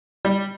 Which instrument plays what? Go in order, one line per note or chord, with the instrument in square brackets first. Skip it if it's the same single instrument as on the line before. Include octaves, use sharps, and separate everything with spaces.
[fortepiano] G3